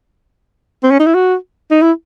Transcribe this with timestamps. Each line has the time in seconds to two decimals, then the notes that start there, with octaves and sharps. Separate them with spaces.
0.83 C4
0.91 C#4
0.99 D#4
1.06 E4
1.15 F#4
1.71 D#4
1.82 E4